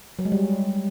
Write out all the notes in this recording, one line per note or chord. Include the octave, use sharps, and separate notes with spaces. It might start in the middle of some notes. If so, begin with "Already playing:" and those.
F#3
G#3
G3